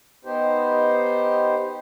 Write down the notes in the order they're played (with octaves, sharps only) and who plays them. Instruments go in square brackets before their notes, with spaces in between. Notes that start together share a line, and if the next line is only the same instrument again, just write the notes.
[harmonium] B3 D#4 G4 C5